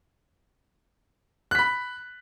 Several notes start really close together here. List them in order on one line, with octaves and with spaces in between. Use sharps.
F#6 B6 B5